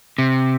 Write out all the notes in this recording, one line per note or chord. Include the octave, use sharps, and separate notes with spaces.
C3